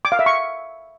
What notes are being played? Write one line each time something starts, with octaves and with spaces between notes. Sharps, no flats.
D6
F5
E5
C#6